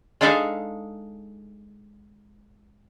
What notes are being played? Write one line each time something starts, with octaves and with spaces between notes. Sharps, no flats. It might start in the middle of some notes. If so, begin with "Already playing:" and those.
G#3 D4 D#4 A4 E5 F5